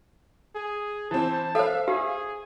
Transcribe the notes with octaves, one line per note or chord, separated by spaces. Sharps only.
G#4
E3 C4 A5
A4 C5 E5 F5
G4 G#4